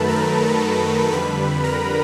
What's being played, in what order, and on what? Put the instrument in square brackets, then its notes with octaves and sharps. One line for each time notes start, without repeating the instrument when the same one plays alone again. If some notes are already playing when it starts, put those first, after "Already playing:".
Already playing: [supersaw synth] F#2 D#3 F#3 A3 A4 B4 A5 B5
A#4 A#5
F2 D3 G3 B4 B5
A#4 A#5